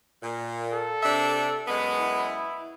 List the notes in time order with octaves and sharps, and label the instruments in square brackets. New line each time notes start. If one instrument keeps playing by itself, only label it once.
[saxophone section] A#2
[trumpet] A4
[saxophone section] C3 D4 E5
F#2 G#3 B3
[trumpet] E4